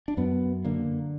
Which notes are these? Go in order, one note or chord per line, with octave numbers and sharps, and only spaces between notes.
D4
F#2 B3
D3 A#3